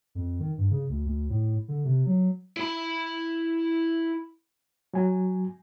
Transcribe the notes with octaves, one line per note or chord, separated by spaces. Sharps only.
F2
D#3
G2
C#3
D2
D2
A2
D3
C3
F#3
E4 B5
F#3 G#5